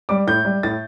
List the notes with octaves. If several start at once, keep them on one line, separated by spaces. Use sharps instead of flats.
G3 D6
A2 G6
G3
A2 A6